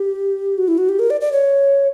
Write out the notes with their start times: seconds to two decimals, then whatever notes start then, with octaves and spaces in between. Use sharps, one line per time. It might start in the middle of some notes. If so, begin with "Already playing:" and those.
Already playing: G4
0.58 F#4
0.68 E4
0.78 F#4
0.89 G4
0.99 A#4
1.10 D5
1.21 D5
1.32 C#5